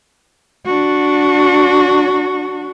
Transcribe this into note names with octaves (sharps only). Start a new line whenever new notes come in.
D4 F#4